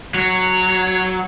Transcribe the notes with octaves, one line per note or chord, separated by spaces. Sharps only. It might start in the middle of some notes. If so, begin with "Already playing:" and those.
F#3 C#5